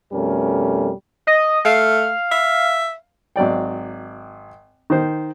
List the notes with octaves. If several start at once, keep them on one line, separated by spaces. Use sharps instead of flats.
F2 B2 G3 A3 C#4 A#4
D#5
A3 F5
E5
G#1 F#3 D5 G5
D#3 C5